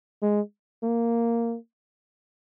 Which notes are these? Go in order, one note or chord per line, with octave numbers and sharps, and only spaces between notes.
G#3
A#3